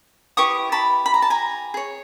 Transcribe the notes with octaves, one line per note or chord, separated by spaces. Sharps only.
E4 G4 B4 C#6 D#6
A5 B5
B5
A#5
A5
G#5 A#5
G#4 C#5